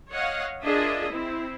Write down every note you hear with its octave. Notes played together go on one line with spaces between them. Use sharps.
C#5 D#5 F5 F#5
D4 F4 G#4 A#4 D#5 E5
C4 E4